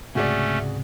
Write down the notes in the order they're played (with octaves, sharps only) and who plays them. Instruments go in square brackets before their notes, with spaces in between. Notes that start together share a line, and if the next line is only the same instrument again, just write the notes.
[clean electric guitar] C#2 G#2 C3 [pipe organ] A3 C#4 [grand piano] F#4 G#4 D5